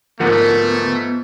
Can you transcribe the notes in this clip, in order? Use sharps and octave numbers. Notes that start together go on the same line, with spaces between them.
D2 G#2 F3 A3 B3 A#4 F#5